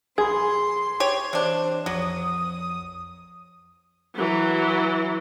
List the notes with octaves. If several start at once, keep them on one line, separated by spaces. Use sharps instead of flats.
A#1 G#4 B5 C6
G4 C#5
C3 E3 D4 C5 D5
A#1 F2 F3 F#3 D#6
E3 F#3